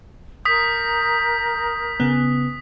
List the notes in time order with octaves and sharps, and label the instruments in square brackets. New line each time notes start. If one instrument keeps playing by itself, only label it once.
[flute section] A#4 G6 [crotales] D#6 B6
[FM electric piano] C#3 B3